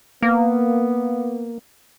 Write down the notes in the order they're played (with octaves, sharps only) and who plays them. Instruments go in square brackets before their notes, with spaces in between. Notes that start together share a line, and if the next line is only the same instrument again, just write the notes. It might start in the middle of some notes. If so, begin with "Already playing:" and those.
[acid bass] A#3 [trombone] B3